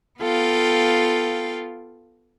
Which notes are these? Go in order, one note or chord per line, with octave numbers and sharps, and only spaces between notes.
B3 F4 A4 F5 G5